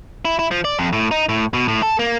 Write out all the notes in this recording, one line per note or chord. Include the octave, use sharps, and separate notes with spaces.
E4
E4
F3
D5
F2
A2
D#4
A2
B2
A2
A4
A#3